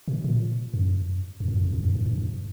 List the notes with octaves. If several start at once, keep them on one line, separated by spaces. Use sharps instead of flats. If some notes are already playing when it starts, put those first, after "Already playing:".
B2
A#2
F#2
F2
F#2
F2
E2
F2
F#2
F#2
G2
F#2